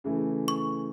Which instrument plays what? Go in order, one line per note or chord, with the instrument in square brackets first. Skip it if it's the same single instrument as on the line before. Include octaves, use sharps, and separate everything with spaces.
[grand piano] C#3 E3 A3
[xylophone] C#6